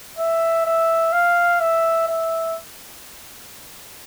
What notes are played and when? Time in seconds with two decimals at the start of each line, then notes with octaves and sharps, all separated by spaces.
0.19 E5
0.66 E5
1.13 F5
1.60 E5
2.08 E5